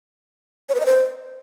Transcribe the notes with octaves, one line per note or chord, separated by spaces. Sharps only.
C#5
B4
D#5
C5